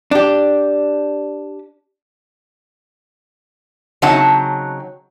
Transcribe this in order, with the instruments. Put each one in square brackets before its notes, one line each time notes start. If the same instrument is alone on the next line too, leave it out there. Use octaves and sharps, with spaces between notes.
[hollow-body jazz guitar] D4 G4
[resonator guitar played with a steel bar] C#3 F#3 C4 D#4 F#5 A5